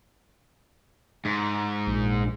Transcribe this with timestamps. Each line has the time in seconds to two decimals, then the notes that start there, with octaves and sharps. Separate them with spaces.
1.25 G#2
1.87 A#1